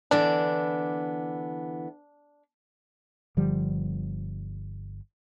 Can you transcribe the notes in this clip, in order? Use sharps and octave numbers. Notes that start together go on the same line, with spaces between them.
D3 E3 B3 D4
G1 D3 F3 G3